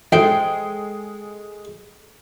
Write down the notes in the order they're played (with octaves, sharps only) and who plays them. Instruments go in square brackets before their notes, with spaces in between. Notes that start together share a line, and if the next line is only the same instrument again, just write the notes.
[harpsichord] A1 G#2 [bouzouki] G#3 [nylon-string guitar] A4 C5 [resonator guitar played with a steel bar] G5